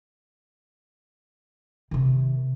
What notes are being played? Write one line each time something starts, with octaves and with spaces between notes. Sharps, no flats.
C3 D#3